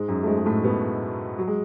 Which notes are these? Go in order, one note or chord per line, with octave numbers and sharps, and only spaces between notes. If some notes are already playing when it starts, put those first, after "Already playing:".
Already playing: G#2 G#3
F#2 F#3
A3
G#2 G#3
G#3
A2 A3
B2 B3
F#3
G#3